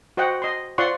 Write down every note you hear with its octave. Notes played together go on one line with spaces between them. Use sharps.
F#4 C5 D#5 F#5 G5
D#5 C6
F4 C5 D5 F#5 C6 C#6